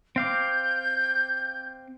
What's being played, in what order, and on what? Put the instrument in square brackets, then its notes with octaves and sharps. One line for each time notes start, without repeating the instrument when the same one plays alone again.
[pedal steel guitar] C4 F5 D6 [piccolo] G6